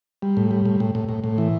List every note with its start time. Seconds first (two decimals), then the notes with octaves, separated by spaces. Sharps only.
0.22 G3
0.37 A2
0.51 G3
0.65 A2
0.80 A2
0.95 A2
1.09 A2
1.24 A2
1.38 E3